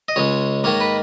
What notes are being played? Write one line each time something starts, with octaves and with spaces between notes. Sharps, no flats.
D#5
C#2 C#3 G#3 C#5
G#2 D#3 A#3 C#5
B4